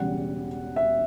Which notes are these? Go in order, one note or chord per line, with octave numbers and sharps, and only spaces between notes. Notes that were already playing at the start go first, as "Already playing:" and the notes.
Already playing: E1 E2 C#3 G3 F#5
E5